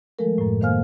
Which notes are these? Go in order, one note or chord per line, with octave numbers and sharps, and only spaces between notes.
D#3 F3 G#3 A3 A4 A#4
F#2 A2
D#3 A#3 C5 F5 G#5 F6